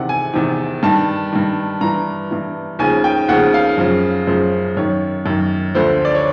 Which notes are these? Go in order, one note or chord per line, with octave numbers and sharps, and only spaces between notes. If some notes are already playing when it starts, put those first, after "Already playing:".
Already playing: E2 C3 D#3 F#5
G#5
E2 C3 D#3
G2 D#3 A5
G2 D#3
G2 E3 A#5
G2 E3
D#2 C#3 F3 G#5
G5
D#2 C#3 F3 F#5
F5
F#2 C#3 F3
F#2 C#3 F3 C5
F#2 D#3 C#5
F#2 D#3
D2 D3 F3 C5
D5
C#5